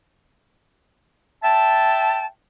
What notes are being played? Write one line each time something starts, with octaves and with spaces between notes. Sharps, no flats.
E5 G5 A5